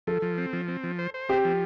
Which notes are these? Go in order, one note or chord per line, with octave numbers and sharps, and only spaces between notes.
F3 A4
F3
C4
F3
C4
F3
C5
C5
C4 G4
F3